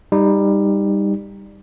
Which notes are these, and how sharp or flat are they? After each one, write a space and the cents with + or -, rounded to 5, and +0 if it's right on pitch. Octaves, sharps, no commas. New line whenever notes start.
G3 +15 D#4 +0